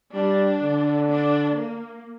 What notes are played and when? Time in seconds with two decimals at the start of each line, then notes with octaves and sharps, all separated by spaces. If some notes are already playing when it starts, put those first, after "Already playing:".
0.14 G3 D4
0.62 D3
1.10 D4
1.57 A#3